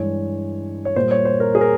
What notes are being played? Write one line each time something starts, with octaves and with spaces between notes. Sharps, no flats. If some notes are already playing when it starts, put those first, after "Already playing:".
Already playing: G2 E3 G#3 C#5
C#5
A#2 G3 C5
C#5
C5
A#4
G#4
A#4